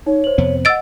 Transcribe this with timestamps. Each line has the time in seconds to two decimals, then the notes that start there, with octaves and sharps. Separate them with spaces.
0.06 D#4 C#5
0.24 C5 F#7
0.38 F2 C3 B3
0.65 D#5 F#5 E6 A6 D7